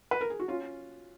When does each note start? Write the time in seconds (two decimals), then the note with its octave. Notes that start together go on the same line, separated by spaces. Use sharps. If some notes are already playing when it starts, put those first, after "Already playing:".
0.11 B4
0.21 A#4
0.30 G#4
0.40 F#4
0.48 C#4 F4